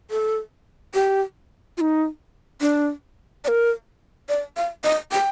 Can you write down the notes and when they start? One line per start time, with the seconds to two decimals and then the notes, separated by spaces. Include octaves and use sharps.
0.11 A4
0.94 G4
1.78 F4
1.81 D#4
2.61 D4
3.44 D5
3.48 A#4
4.29 D5
4.57 F5
4.84 D#5
5.12 G5